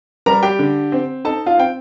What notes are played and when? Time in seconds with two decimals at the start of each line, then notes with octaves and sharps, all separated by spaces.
0.26 G3 A#4 A#5
0.43 G4 G5
0.59 D3
0.92 C4
1.25 D#4 A4 A5
1.46 F4 F5
1.58 C4 G5